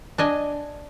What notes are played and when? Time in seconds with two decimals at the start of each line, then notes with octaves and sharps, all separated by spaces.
0.18 D4 D#5 G#5